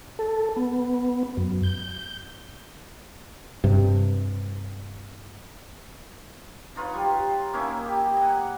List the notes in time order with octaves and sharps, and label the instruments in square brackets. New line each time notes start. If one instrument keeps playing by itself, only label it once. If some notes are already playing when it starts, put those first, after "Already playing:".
[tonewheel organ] A4
B3
F#2
G6
[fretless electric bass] G2 C3
[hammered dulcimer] D#4 F4 B4 C#5
G3
A#3 C#4 D#4 E4
G4
D#5 F#5